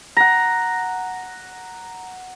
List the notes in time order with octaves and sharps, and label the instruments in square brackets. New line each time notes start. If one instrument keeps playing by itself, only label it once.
[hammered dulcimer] F#5 A#5